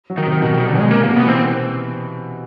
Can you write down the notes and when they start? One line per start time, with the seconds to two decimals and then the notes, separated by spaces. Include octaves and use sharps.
0.10 F#3
0.18 D#3
0.26 C3
0.42 B2 D#3
0.54 C3 D#3
0.66 D3
0.75 B2 G#3
0.86 C#3
0.91 C3 A#3
1.04 B2 A#3
1.16 B3
1.25 E3 C4